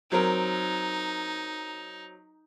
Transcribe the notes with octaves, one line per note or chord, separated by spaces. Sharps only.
F#3 C4 D#4 A#4